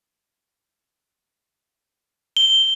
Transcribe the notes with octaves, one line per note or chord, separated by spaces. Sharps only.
G7